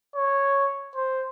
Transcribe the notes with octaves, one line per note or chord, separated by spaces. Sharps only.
C#5
C5